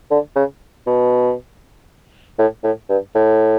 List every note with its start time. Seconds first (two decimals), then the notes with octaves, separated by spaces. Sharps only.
0.11 D3
0.36 C#3
0.87 B2
2.39 A2
2.64 A2
2.89 G2
3.15 A2